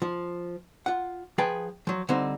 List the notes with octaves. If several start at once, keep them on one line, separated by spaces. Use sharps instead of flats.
F3
F4 F#5
F3 G#4 B4 G5 A5
F3 F#3
D3 G3 C4 D#4 C5